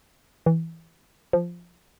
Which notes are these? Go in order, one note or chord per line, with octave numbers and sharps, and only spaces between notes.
E3
F3